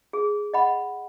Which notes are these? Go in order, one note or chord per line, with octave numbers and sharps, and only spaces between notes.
G#4
D#5 F#5 B5